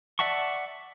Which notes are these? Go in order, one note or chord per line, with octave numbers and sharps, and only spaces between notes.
D5 E5 F#5 A5 C#6